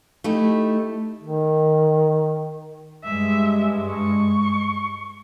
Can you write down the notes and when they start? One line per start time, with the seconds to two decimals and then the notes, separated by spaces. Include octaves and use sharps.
0.24 A3 D#4 E4 G4
1.22 D#3
3.04 G2 G#3 E5
3.90 C#6